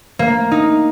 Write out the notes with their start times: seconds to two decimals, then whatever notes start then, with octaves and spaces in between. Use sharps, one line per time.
0.19 A#3
0.52 D#4